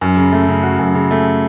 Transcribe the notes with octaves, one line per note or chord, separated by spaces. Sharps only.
F#2
C#3
A3
C#3
F#4
F#2
C#3
A3